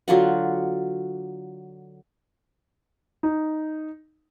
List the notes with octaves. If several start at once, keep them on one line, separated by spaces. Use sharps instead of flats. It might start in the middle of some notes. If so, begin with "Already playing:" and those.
D3 F#3 F4 F#5
D#4